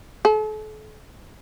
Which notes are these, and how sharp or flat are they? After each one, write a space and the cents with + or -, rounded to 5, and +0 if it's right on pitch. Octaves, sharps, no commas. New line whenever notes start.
A4 -40